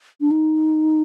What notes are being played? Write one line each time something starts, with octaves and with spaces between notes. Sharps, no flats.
D4
D#4